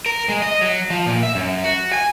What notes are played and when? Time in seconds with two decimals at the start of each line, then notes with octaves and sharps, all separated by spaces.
0.06 A#4
0.29 G#3
0.42 D#5
0.62 F#3
0.90 F3
1.07 A#2
1.23 E5
1.35 F#2
1.64 F#4
1.93 G#5